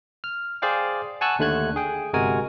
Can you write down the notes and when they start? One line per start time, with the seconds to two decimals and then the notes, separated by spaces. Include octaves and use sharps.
0.24 F6
0.62 G#4 C5 D5 F5 G5
1.21 F#5 G#5 A5 C#6 E6 F#6
1.39 D#2 D3 A3 F#6 G#6
1.76 G#4 G5
2.13 G1 C3 G#3 F#4 A#4 G#5